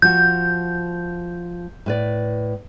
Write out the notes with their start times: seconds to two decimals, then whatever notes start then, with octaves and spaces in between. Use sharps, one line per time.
0.02 F3 F#4 G6
1.86 A2 B4 D5